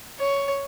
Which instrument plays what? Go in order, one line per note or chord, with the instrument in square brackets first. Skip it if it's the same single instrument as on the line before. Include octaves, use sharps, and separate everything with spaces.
[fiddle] C#5